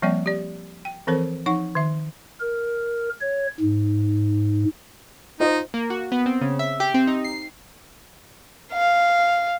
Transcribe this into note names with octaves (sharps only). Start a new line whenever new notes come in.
F3 G3 A#3 C4 D5 G5
G4 D5
G5
E3 F3 C4 A4 A#4 C5
F3 D#4 F#5 C#6
D#3 E5
A#4
C#5
G#2
D#4 F4 C5 D#5
A#3
F#4
B3
C4
C#3
E5
G4
C4
D#4
C7
F5